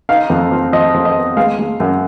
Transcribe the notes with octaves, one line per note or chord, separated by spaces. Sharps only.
D#4 F5
F2
F3
F3 D#5
F2
D#5
B3
G#3 F5
G#3
F#2